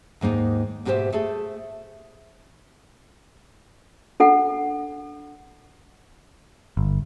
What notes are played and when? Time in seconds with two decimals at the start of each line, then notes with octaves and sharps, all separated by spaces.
0.21 D#2 G#2 A#3 D#4
0.85 G#2 B2 G4 A#4 C5 E5
1.12 A3 G#4 A4
4.20 D4 A4 F#5
6.77 G1